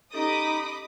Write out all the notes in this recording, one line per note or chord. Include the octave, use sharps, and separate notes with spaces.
C#4 D#4 G4 A4 D#5 B5 D6 D#6